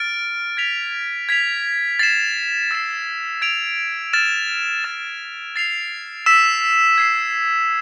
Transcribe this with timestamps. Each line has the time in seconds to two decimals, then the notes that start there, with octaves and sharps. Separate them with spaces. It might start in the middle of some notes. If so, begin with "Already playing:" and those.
Already playing: F6 A6 D7
0.57 G#6 B6 F7
1.29 G#6 B6 F7
1.99 A6 C7 E7
2.71 E6 A6 C7 E7
3.42 G#6 D7 F7
4.13 F6 A6 E7
4.84 F6 A6 E7
5.56 A6 C7 F7
6.26 E6 B6 E7
6.98 G#6 C7 E7